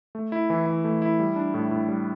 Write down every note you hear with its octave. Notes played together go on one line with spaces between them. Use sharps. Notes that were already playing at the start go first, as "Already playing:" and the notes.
A3
E4
E3
E3
A3
E4
G3
D4
A2
A2
G3